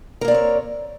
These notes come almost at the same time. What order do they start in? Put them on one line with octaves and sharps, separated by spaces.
A#4 A#3 D5 C4 C#5